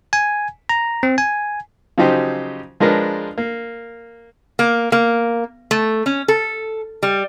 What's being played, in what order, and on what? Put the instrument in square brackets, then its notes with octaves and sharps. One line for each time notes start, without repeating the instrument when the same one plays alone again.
[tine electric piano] G#5
A#5
C4
G#5
[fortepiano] C#3 F3 F#3 D#4 G4 C5
F3 G#3 D4 A#4 B4
A#3
[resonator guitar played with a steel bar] A#3
A#3
A3
C#4
A4
G3